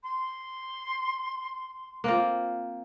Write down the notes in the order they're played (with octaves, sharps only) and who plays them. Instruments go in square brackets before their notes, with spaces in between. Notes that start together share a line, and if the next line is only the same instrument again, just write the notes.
[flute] C6
[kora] A#3 C4 F4